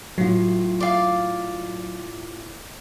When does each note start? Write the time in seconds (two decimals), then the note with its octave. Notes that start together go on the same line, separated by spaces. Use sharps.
0.18 A2 F#3 F4
0.80 D5 F5